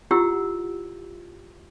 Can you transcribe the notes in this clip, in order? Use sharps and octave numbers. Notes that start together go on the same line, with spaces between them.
E4 F4 G4 F#5 E6